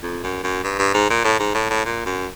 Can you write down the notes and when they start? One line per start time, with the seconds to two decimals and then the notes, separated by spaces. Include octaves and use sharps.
0.03 F2
0.24 F#2
0.44 F#2
0.64 G2
0.79 G2
0.94 G#2
1.10 A#2
1.24 A2
1.39 G#2
1.55 A2
1.70 A2
1.85 A#2
2.06 F#2